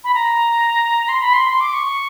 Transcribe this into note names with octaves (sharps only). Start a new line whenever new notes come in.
B5
A#5
C6
B5
C6
C6
D6
C#6